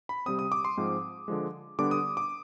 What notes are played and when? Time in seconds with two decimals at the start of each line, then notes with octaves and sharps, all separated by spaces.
0.09 B5
0.26 C3 G3 C4 D#6
0.39 D#6
0.52 D6
0.65 C6
0.77 G#2 F3 G#3 C4
1.28 D3 F3 G#3
1.79 D3 G3 B3 D4 D6
1.91 D#6
2.17 D6